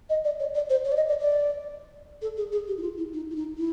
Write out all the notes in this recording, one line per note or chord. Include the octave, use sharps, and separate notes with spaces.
D#5
D5
C#5
D5
C5
C#5
D5
D#5
D5
D5
A4
G#4
G#4
G4
E4
F4
E4
D#4
E4
D#4
E4